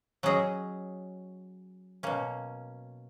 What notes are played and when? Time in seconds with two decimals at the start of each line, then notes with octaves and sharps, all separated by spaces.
0.23 F#3 C#4 G#4 D#5
2.03 B2 A#3 C#4